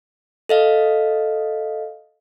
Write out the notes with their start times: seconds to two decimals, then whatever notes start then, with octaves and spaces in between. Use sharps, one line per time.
0.49 A4 D#5 F5